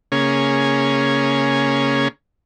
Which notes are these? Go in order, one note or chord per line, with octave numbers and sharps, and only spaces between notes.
C#3 A#3 C#4 G#4